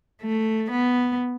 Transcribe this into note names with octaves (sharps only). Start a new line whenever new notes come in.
A3
B3